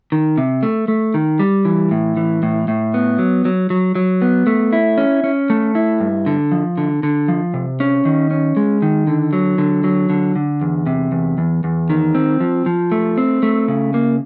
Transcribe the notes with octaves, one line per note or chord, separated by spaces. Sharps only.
D#3
C3
A3
A3
D#3
G3
E3
A2
E3
A2
A2
B3
F#3
F#3
F#3
F#3
B3
A3
E4
C#4
C#4
A3
E4
G2
D3
F3
D3
D3
F3
C3
C#4
D#3
C#4
G#3
D#3
D3
F#3
D3
F#3
D3
D3
E2
C3
E2
E2
E2
D#3
C4
F3
F3
A3
C4
A3
C#3
A#3